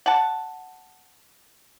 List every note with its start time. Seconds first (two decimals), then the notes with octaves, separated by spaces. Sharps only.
0.06 F#5 A5